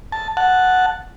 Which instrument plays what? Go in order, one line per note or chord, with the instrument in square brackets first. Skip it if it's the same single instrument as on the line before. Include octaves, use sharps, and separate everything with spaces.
[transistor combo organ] A5
F#5 A5